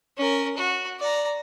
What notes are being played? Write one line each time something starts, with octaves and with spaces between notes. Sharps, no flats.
C#4 A#4
F#4
D5 A#5